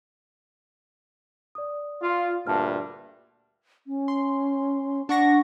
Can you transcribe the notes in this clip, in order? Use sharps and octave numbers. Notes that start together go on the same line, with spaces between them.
D5 D#6
F4
D2 G2 A#2 E5 A5 F6
C#4
C6
D4 F#5 C#6 A#6